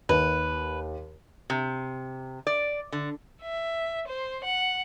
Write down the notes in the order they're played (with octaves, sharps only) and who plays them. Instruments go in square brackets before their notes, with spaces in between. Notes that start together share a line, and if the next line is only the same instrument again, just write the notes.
[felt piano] D#2 [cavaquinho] B4
[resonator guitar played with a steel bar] C3
D5
D3
[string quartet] E5
C5
F#5